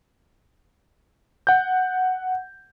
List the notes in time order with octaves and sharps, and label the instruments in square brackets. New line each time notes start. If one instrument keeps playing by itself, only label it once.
[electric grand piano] F#5 G6